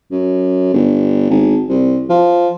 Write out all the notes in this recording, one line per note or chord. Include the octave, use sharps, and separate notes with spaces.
F#2
G1
G#1
C2
F3